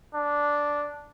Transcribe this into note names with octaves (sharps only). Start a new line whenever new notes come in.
D4